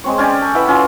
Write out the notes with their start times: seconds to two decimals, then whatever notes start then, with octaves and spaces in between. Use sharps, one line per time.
0.04 G#3 C4 C#5
0.18 C#4 G4 D5 G#5
0.42 A4
0.55 E3 E5 F#5 B5
0.68 C#4 F4